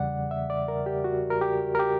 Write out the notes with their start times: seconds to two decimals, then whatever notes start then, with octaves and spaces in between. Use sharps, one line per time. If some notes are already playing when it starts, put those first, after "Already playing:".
Already playing: E2 C#3 G3 D5 F#5
0.31 E5
0.50 D5
0.68 A#4
0.86 G4
1.04 F#4
1.30 A#4
1.41 G4
1.75 A#4
1.79 G4